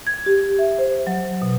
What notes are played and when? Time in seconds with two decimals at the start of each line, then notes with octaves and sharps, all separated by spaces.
0.07 G#6
0.26 G4
0.59 E5
0.78 C5
1.07 F#3
1.42 B2